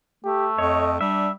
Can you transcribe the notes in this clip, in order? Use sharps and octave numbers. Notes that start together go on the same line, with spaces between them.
A3 G4
F2 C#5 D#5
G3 D4 E5